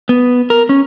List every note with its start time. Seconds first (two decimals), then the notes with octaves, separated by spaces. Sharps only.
0.09 B3
0.50 A#4
0.69 C#4